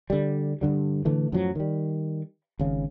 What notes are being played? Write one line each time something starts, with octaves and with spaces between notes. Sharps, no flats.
D3 G3
G2 D3 G3
A2 D3 E3 A3
F#2 A2 F3 F#3
D#3 G3
G#1 C#3